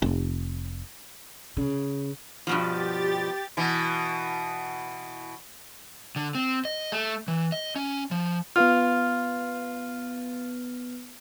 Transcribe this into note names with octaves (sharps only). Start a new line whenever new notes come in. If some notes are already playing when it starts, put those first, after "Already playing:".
F1
C#3
G2 B2 F3 G4 A6
B2 E3
D3
C4
D#5
A3
E3
D#5
C#4
F3
B3 F4 B4 F6